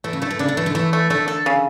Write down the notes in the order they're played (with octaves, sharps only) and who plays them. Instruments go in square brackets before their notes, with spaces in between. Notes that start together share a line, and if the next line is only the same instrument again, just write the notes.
[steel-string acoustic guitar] E3 [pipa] A3
[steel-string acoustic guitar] C#3
[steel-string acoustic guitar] D3 [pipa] A3
[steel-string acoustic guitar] E3
[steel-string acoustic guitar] C#3 [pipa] D4
[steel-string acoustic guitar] D3
[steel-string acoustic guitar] E3 [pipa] A3
[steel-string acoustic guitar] D3
[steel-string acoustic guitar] E3 [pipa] A3
[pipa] A3
[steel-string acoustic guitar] D3 [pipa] A3
[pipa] A4
C#3